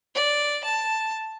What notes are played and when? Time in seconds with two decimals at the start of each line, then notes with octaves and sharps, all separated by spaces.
0.15 D5
0.64 A5